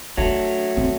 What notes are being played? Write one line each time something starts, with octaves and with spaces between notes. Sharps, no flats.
F#3 A3 D4
C4